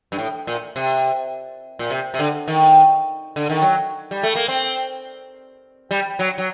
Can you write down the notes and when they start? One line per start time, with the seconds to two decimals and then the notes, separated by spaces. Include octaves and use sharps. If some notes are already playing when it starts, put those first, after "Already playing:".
0.12 G2
0.19 A2
0.47 A#2
0.76 C3
1.79 A#2
1.90 C3
2.14 C3
2.19 D3
2.48 D#3
3.36 D3
3.50 D#3
3.62 F#3
4.11 G3
4.23 A3
4.35 A#3
4.48 C4
5.91 G3
6.19 F#3
6.38 F#3